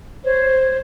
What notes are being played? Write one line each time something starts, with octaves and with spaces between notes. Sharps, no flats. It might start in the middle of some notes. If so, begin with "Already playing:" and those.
C5 C#5